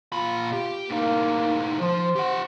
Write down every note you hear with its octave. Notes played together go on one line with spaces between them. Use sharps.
A#2 F4 B5
G4
A2 A#3 D#4
F3 C5
G4 F#5